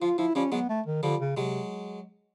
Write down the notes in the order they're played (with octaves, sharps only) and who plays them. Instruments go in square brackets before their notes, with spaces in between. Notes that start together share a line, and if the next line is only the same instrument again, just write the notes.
[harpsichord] F3 [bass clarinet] F4
[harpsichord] F3 [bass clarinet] E4
[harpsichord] F3 G3 [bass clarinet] C#4
[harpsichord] F#3 G#3 [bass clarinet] B3
[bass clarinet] A3
D#3
[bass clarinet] D3 [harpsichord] F3 G3
[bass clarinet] C#3
[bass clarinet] C3 [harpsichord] F#3 G#3